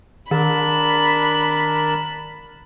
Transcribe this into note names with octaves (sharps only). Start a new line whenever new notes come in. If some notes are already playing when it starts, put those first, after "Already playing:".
D#3 D4 A#4 A5 B5